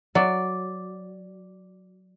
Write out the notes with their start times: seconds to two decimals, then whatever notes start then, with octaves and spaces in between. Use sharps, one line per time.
0.15 F#3 D5